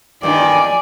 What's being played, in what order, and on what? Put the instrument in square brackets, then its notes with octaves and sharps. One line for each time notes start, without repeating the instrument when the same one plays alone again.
[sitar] G2 D#3 [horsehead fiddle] D5 G#5